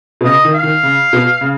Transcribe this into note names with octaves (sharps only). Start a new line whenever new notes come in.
B2
C#3 D#5
D#3
F5
D#3
C#3
B2
C#3